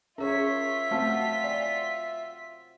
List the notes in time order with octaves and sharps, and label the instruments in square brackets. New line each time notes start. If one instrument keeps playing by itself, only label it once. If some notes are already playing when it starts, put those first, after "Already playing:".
[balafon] C#4 G#4 [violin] F4 B6 [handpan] A#4 C#5 [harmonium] E5
[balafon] A3 A5 [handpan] C4 F#4 C5
[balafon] D5